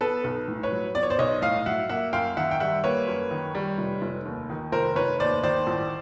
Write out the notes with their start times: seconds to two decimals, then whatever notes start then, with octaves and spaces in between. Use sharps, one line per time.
0.01 B3 A4 B4
0.24 B1
0.48 A2
0.63 B4 C#5
0.72 F#3
0.95 B3 D5
1.03 C#5
1.10 C5 D5
1.19 B1 C#5 D#5
1.42 A2 D#5 F5
1.66 F#3 E5 F#5
1.89 A#3 E5 F#5
2.13 F#2 F5 G5
2.37 D#3 E5 F#5
2.51 G5
2.60 G3 E5 F#5
2.84 A#3 B4 C#5
3.07 F#2
3.31 D#3
3.55 G3
3.78 F1
4.02 F1
4.25 D#2
4.50 D#3
4.72 F1 A#4 C5
4.96 F1 B4 C#5
5.20 D#2 C5 D5
5.43 D#3 C5 D5
5.67 A1